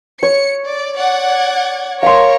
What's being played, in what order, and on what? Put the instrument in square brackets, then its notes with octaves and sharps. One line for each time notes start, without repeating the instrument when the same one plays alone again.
[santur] C#5 [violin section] C#7
[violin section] D5
D5 F#5 G#6
[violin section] A#4 C#5 [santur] F5 C6